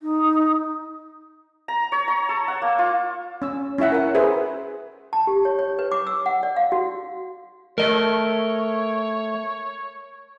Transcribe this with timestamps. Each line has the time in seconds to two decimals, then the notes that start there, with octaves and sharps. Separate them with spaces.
0.02 D#4
1.68 A#5
1.92 C#5
2.08 A#5
2.29 A4
2.48 F#5
2.62 A#3
2.79 F4
3.42 C#4 E6
3.78 C#4 E4 E5 F#5
3.92 A#4 F#5
4.15 G#4 B4 C5 E5
5.13 A5
5.27 G4
5.45 C#5
5.59 C#5
5.79 B4
5.92 D6
6.07 E6
6.26 F#5
6.43 D5
6.57 F5
6.72 F#4
7.78 A3 A#4 C#5 D#5